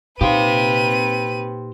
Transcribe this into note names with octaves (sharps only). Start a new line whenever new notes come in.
A#2 D#4 G4 B4 C5 F5 B5 D#7